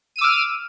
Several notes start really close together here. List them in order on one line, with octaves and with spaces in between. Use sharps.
D#7 E6 D6 F6